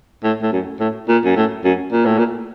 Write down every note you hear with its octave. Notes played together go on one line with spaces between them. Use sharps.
A2
A2
F#2
A2
A#2
F#2
A2
F#2
A#2
A2
A#2